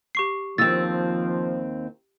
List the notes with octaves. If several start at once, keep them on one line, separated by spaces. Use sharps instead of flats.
G4 C#6 C7
D#2 F3 C4 E6 A6